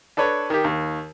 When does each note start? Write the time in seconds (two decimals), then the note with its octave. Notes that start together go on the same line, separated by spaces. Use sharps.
0.17 D4 A4 B4 C#5
0.50 D#3 G4
0.64 D#2